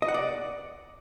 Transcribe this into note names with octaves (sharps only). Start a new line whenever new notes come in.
D#5
F#5
D5